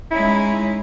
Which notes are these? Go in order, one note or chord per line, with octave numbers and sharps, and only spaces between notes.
G#3 C#4 D#4 E4